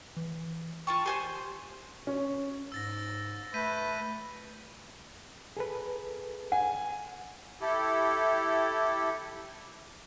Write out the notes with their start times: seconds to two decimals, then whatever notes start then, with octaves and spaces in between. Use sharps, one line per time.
0.17 E3
0.87 F4 G5 A5 C#6
1.06 G4 C5 G#5 C6
2.07 C#4
2.72 G#2 E6 A6 A#6
3.54 A3 B4 G6 B6 D#7
5.57 G#4 A4 B4
6.52 F#5 G#5
7.61 E4 G4 A4